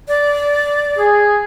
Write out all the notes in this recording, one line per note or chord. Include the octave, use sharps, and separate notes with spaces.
D5
G#4